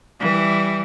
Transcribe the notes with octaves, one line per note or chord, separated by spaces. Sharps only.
E3 G3